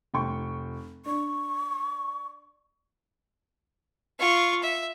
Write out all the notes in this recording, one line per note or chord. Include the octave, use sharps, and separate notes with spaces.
F1 G5 C#6
D4 C#6
F4 C#6
E5